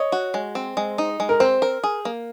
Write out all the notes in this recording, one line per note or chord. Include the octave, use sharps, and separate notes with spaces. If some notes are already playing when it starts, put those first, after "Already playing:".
Already playing: C#5 D#5
F#4
G#3
C4
G#3
D#4
G#3
A#4
C4 C5
A#4
G#4
A#3